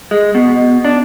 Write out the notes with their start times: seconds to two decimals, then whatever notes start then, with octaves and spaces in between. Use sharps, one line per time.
0.11 G#3
0.35 B2
0.85 D4